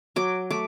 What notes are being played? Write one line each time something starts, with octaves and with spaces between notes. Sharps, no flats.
F#3 D6
A3 D6